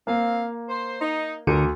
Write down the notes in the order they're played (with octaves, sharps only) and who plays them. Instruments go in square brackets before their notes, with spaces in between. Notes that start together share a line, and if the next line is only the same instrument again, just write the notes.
[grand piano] A#3 [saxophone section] C4 F5
[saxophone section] C5
D#4
[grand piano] D2 [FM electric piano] D3 [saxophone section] D4 A#4